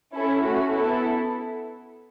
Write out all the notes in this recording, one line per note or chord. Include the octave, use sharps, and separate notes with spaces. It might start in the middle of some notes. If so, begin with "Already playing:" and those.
C#4 E4 A4
A3 C#4 F#4
B3 E4 A4